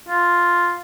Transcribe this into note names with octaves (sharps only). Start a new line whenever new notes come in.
F4